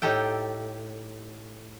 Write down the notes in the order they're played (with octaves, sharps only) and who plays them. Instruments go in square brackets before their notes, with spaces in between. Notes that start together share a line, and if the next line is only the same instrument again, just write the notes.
[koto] A2 D#4 G4 A4 G5